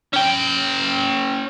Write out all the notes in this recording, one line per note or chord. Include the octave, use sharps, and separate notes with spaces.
C#4 G5